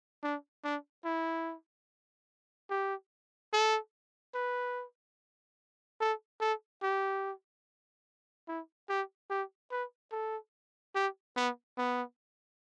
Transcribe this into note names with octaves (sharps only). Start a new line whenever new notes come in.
D4
D4
E4
G4
A4
B4
A4
A4
G4
E4
G4
G4
B4
A4
G4
B3
B3